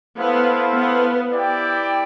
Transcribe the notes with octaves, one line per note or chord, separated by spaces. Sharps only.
B3 E4 A4 C5 F5
B3
E4 G4 D5 G5